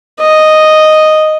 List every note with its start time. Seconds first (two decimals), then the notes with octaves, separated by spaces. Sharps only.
0.20 D#5